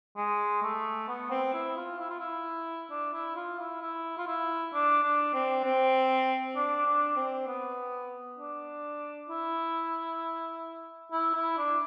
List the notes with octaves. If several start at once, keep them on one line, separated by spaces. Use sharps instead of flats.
G#3
A3
B3
C4
E4
F4
E4
F4
E4
D4
E4
F4
E4
E4
F4
E4
D4
D4
C4
C4
D4
D4
C4
B3
D4
E4
E4
E4
D4